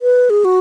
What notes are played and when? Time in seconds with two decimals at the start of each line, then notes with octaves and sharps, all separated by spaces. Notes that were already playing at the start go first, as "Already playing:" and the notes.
0.02 B4
0.30 G#4
0.45 F#4